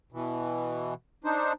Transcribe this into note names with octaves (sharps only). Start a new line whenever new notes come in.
B2 E3
D4 D#4 C5